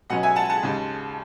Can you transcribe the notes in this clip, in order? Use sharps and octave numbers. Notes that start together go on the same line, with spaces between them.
B2 F#3 C#4 D#5 F#5
E5 G#5
F#5 A5
F#5 A5
D#2 C#3 G#3